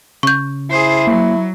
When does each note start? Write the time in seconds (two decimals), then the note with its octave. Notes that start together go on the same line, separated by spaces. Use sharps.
0.23 C#3 C#6 G6
0.70 E4 G#4 C5
1.07 F#3 A#3